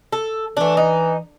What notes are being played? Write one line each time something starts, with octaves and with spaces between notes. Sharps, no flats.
A4
E3 A3 D4
D#4